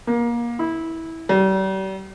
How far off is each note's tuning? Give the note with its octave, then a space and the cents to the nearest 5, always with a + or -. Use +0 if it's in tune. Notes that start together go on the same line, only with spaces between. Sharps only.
A#3 +25
E4 -15
G3 -40